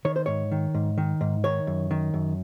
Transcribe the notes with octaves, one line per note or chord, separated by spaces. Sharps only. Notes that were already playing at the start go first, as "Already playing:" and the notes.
D#3 C#5
C5
G#2 C#5
D#3
G#2
D#3
G#2
D#3 C#5
F#2
D#3
F#2